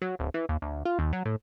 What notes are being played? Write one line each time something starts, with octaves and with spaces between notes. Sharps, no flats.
F#3
D1
E3
D#2
D2
F4
D#2
F#3
A2